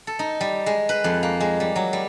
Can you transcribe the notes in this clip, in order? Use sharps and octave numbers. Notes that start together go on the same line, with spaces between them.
A4
D#4
G3
G#3
B4
F2
A#3
G#3
G3
F#3
G3